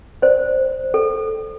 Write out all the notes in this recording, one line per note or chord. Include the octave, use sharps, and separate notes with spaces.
C5 D5
A4